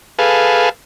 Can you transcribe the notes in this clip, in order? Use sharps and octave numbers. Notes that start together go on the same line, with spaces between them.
G#4 A4 B4 F5